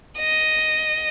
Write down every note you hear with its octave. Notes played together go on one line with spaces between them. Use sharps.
D#5